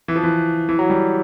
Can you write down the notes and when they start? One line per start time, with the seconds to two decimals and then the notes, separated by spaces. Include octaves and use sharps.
0.08 E3
0.16 F3
0.23 E3
0.69 E3
0.79 F#3
0.90 G3